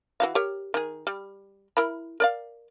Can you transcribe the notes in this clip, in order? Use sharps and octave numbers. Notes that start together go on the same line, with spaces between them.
E3 F#4 F5
G4 A#4 C#5
D#3 G#4
G3
E4 A#4 B5
A#4 D5 F5